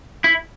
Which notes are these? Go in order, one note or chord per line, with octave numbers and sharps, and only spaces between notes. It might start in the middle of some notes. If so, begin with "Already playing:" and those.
E4